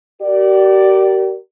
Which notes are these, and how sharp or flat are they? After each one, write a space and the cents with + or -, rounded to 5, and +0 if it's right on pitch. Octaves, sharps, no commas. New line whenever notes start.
G4 -40 A#4 +0 D5 +0